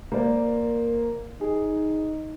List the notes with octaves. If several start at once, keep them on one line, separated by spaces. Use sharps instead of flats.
A#3 C5 D5
A#4
D#4 G#4